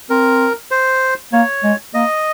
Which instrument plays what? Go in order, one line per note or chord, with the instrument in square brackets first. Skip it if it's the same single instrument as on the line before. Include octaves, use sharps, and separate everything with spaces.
[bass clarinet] C4 [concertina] A#4
[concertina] C5
[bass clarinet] A#3 [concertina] C#5
[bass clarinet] G#3
[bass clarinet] A#3 [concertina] D#5